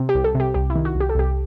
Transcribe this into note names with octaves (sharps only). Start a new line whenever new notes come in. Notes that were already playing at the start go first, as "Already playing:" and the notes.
Already playing: C3
G4
C2
A4
C3
G4
C2 G4
E4
D#3
F#4
C2
G4
A4
C2 G4